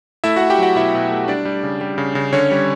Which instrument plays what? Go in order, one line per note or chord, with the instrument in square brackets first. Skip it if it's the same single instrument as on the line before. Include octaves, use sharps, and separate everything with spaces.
[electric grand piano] A3 E4 E5
A3 F#4 F#5
G4 G5
F#3 F#4 F#5
B2 E4 E5
B2
A3
G3 D4 D5
G3
C#3
G3
C#3
C#3
D3 C#4 C#5
G3